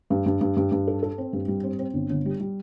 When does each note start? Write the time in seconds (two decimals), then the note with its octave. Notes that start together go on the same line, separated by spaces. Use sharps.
0.10 G2
0.26 G2
0.41 G2
0.57 G2
0.72 G2
0.87 A4
1.03 A4
1.18 C4
1.33 G2
1.48 G3
1.64 C4
1.79 C4
1.94 G1
2.10 G1
2.26 G3
2.40 G3